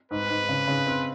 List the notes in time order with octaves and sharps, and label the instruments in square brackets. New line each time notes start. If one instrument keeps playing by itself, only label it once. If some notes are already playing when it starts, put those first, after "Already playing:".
[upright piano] G#2 [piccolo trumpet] B4
[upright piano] G#2
C#3
C#3
C4